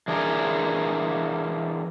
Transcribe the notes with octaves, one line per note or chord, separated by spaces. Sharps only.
E3 D4 G#4 A#4